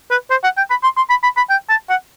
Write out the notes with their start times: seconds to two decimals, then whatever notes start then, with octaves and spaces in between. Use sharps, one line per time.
0.11 B4
0.31 C5
0.44 F#5
0.57 G5
0.70 B5
0.83 C6
0.97 C6
1.10 B5
1.23 B5
1.37 B5
1.50 G5
1.69 A5
1.90 F#5